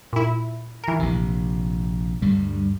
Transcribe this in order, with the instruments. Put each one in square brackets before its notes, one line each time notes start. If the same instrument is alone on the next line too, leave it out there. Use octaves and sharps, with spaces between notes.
[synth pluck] A#2 E4
E3 A#4
[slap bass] A#1 C3
D2 G2 G3